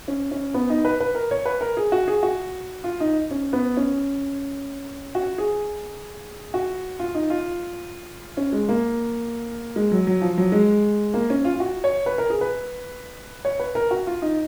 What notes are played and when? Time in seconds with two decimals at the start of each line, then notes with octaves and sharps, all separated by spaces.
0.08 C#4
0.31 C#4
0.54 B3
0.70 D#4
0.85 B4
1.00 B4
1.15 A#4
1.31 C#5
1.46 B4
1.61 A#4
1.77 G#4
1.92 F#4
2.08 G#4
2.23 F#4
2.84 F4
3.00 D#4
3.31 C#4
3.53 B3
3.77 C#4
5.15 F#4
5.38 G#4
6.54 F#4
6.99 F4
7.14 D#4
7.30 F4
8.37 C#4
8.53 G#3
8.69 A#3
9.76 G#3
9.92 F#3
10.07 F#3
10.21 F3
10.38 F#3
10.52 G#3
11.14 A#3
11.30 C#4
11.45 F4
11.55 F4
11.60 F#4
11.84 C#5
12.06 B4
12.18 A#4
12.30 G#4
12.41 B4
13.45 C#5
13.60 B4
13.75 A#4
13.91 F#4
14.07 F4
14.22 D#4